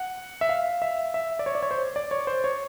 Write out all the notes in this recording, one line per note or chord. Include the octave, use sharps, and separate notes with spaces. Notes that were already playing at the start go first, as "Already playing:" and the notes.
Already playing: F#5
E5
F5
E5
E5
D5
C#5
D5
C#5
C5
D5
C#5
C5
C#5